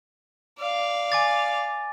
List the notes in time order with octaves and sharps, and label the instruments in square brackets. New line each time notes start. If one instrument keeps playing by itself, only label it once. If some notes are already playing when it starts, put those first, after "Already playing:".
[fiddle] D5 F5
[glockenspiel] G#5 D6 A6